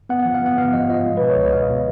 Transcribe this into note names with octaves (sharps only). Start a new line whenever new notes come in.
B3 F#5
F3 F#5
F5
B3 F#5
B3 F5
F3 D#5
F3 D#5
G#3
B2 B4
C#5
C#2 D#5
B2 F5
B2